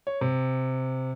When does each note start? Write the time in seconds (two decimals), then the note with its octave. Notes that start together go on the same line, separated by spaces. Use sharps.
0.07 C#5
0.21 C3